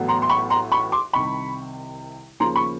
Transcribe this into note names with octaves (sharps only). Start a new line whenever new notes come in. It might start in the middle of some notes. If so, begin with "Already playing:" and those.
Already playing: A1 A2 F#3 B3
A#5 C6
C6
B5 C#6
A#5 C6
B5 C#6
C6 D6
C2 C3 D#3 B5 C#6
D#2 C#3 F3 A#3 A#5 C6
B5 C#6